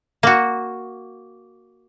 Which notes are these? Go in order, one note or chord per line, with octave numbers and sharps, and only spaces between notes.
A#3 F#4